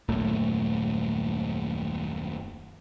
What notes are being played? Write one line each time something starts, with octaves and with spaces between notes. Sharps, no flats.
D#1 F#2 A#2 A3